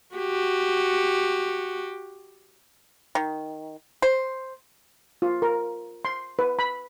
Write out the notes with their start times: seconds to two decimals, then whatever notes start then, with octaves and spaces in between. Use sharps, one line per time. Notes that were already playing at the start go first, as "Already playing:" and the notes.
0.16 F#4 G4
3.15 D#3
4.02 C5
5.22 F4
5.42 A#4
6.05 C6
6.39 B4
6.59 B5